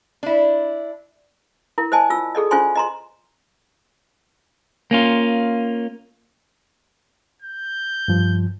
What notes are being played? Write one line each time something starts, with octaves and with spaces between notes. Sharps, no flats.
D4 E4
E4 A#4
C5 D5 D#5 G#5 A5
F4 E6
G#4 A4 D5 D#5
C#4 F4 C5 D5 G#5 C6
D#5 A#5 C6
A#3 C#4 F4
G6
G2 F3